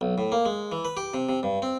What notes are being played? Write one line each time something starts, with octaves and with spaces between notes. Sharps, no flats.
B1
A2
A#3
G#3
E3
B4
G4
C3
C3
G2
C4